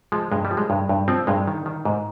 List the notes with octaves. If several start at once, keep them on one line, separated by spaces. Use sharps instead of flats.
F3 G#3
G2 G#3
G3
F3
G#3
G2
G2
F3 C4
G2 G#3
D#3
D#3
G#2